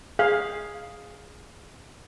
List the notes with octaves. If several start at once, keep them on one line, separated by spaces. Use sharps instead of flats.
G#4 F5